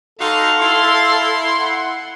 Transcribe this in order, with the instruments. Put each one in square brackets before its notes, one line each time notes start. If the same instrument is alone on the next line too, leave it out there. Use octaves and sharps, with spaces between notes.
[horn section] D#4 F#4 C6 [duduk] A4 [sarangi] F5
[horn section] E4 C6
[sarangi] F#5